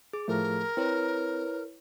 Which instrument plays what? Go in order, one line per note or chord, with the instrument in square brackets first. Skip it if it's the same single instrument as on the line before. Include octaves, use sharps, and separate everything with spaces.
[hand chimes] G#4 [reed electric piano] D6
[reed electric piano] A2 F3 A3 [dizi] A#4
[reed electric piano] C4 [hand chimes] E4 B4 C#5